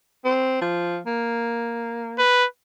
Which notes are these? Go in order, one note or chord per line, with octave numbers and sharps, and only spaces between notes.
C4
F3
A#3
B4